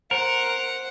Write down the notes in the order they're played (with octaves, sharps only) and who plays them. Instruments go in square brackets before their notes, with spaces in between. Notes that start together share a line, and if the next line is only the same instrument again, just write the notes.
[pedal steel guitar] A#4 [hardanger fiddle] C5 F#5